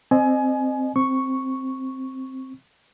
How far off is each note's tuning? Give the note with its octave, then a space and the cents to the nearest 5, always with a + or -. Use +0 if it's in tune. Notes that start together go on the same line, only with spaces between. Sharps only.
C4 +0 D#5 -30 G#5 +25
C4 +5 C#6 +0